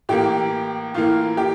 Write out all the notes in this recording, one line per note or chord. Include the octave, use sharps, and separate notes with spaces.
A2 E3 A#3 G4
A2 E3 A#3 F4
G4